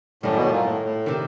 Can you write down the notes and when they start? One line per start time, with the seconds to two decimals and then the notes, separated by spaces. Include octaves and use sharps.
0.23 F#2 A2 D#3 G3
0.36 B2
0.45 A2
0.50 A#2
0.64 A2
0.85 A2
1.06 C3 D#3